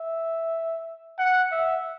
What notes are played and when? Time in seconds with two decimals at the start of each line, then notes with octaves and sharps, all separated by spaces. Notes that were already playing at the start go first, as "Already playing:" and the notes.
Already playing: E5
1.19 F#5
1.51 E5